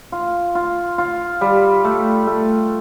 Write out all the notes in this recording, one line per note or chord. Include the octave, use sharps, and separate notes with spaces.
F4
F4
F4
G3
A3
A3